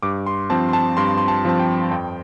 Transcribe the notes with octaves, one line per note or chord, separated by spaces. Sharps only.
G2 D6
C6
F3 C4 A5
C6
A5
G2 C6
C6
A5
F3 C4 A5
G5
F2 G5